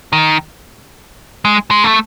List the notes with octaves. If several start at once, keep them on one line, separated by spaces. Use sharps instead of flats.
D#3
G#3
G#3
A3